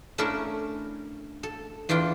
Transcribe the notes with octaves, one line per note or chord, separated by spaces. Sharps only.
A3 C#4 D4 E4 A4 A#4
A4
E2 E3 D4 F4 G5